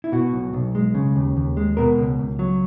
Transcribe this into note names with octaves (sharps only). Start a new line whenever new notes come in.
E4
B2 F#4
B1
B1
G#3
C#3
D#2
D#2
G#3
B2 A#4
C#2
C#2
F#3